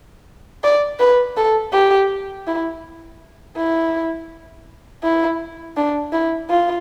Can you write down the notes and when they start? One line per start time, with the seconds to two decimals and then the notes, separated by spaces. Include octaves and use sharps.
0.64 D5
0.99 B4
1.37 A4
1.73 G4
2.47 E4
3.56 E4
5.03 E4
5.77 D4
6.12 E4
6.50 F4